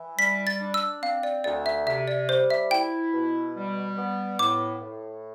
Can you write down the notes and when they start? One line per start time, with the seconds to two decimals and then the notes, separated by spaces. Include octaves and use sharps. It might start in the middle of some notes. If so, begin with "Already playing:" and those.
Already playing: E3
0.18 G3 B6
0.47 A6
0.60 D4
0.74 E6
1.02 C4 F5
1.23 D5
1.44 D2 D5
1.66 E5
1.87 C3 E5
2.08 D5
2.29 G3 C5
2.50 E5
2.71 E4 G5
3.13 B2
3.56 G3
3.97 B3
4.39 A2 D6
4.81 A2